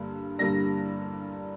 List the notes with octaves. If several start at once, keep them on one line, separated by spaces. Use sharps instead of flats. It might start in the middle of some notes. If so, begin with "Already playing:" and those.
Already playing: G2 D3 G3 A#3
G2 D3 G3 A#3 D4 A#6